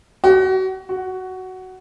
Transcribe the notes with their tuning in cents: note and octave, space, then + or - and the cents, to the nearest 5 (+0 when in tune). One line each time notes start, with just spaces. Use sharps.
F#4 +30
F#4 +10